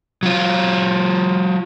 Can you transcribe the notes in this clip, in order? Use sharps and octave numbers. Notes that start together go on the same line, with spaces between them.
F#3 F4